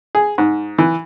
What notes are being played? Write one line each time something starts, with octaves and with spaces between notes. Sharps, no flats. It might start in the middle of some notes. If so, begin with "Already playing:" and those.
G#4
G#2
E3